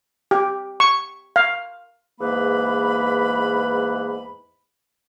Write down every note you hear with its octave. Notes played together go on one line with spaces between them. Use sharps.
G4
C#6
F5
E2 G#2 A#3 B4 B5